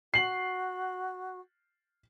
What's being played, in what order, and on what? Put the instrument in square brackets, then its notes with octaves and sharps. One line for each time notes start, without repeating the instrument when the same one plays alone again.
[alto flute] F#4 [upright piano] C7 F#7